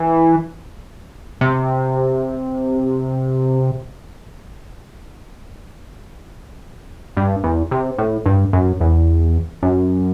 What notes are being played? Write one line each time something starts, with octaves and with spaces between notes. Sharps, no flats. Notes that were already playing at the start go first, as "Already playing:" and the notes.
Already playing: E3
C3
G2
E2
C3
A2
G2
F#2
E2
F#2